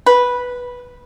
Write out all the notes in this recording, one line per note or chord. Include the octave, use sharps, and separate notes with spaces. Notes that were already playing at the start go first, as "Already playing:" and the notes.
B4